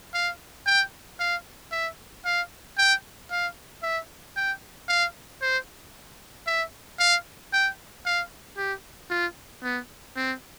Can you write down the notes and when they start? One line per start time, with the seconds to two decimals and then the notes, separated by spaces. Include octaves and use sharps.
0.14 F5
0.66 G5
1.20 F5
1.72 E5
2.25 F5
2.78 G5
3.31 F5
3.83 E5
4.36 G5
4.89 F5
5.42 C5
6.47 E5
6.99 F5
7.53 G5
8.06 F5
8.57 G4
9.10 F4
9.63 B3
10.17 C4